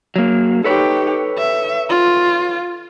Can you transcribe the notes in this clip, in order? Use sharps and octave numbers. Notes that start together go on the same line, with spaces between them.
F#3 A#3
D#4 G4 A4 B4 C#5
E5
F4